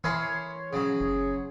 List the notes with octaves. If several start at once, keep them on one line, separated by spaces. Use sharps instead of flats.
E3 E4 G#4 A#4 C#5 C6
C#3 F#3 G#4
F#1